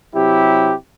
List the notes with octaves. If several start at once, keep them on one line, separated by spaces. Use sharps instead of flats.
C3 F#3 E4 G4